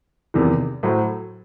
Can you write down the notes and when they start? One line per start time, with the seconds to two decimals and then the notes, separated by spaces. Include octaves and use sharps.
0.34 E2 C3 D#3
0.83 A2 F#3 C5